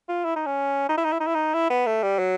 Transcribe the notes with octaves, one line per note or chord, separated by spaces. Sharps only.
F4
E4
D#4
C#4
D#4
E4
D#4
E4
D#4
E4
D#4
E4
B3
A3
G3
F#3